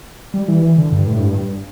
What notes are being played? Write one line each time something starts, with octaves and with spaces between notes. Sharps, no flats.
G3
E3
E3
D3
G2
A2
G2